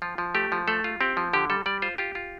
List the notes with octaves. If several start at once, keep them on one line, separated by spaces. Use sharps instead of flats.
F3 F4
F3
A3 G4
F3
A3 A4
F4
C4 G4
F3
D3 G4
G3 A4
G3 D5
F4 C5
F4 G4
F4